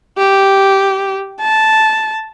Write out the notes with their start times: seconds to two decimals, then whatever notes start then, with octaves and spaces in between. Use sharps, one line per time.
0.18 G4
1.41 A5